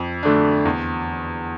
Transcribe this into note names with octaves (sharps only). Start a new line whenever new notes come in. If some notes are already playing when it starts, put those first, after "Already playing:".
Already playing: F2
D3 A3 D4
E2